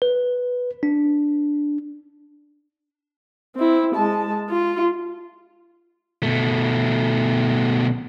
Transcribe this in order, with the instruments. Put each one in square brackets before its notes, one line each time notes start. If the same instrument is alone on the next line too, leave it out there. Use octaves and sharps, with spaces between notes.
[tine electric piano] B4
D4
[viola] C4 E4
G#3 A5
F4
[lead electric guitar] B2 A3